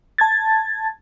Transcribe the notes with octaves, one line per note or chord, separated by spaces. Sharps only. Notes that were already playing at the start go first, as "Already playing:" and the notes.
A5 G#6 A6